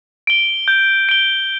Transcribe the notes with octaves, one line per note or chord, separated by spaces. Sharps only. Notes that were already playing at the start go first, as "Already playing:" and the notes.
D7 G7
G6
D7 G7